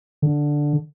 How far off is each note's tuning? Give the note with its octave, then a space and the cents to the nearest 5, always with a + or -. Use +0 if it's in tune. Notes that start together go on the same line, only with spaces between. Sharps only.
D3 +0